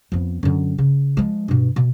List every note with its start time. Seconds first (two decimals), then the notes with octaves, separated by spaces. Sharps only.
0.12 F2 B3
0.43 F#2 D3
0.78 C#3
1.17 F3 G#3
1.48 G2 B2
1.76 B2